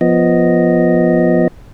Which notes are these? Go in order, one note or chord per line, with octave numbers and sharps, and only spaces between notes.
F3 B3 D#5